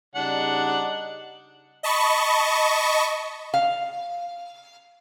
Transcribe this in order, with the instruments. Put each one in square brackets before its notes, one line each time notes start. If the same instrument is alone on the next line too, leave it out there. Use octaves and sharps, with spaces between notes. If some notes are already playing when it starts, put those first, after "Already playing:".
[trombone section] C#3 G3 D#4 [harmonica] D4 F#5
[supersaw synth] D#5 A5 B5 C#6
[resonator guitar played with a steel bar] F5